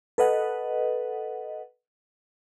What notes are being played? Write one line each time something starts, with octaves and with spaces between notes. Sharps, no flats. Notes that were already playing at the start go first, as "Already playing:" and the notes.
A4 B4 D#5 F#5